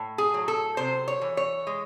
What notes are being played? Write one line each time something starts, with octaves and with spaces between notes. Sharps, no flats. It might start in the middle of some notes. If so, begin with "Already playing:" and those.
Already playing: A2
G#4
F#3
A4
C3 C5
C#5
E3
C#5
G#3